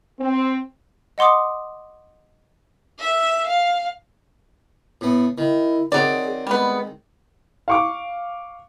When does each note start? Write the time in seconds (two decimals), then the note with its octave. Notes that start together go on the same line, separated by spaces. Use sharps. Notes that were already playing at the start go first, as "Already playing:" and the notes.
0.19 C4
1.18 D#5 F#5 C6 D6 D#6
3.00 E5
3.47 F5
5.01 A2 B3
5.38 D#3 E4
5.92 D#3 F#3 C4 G#4 D5
6.47 G3 G#3 B3
7.68 F5 C#6 D6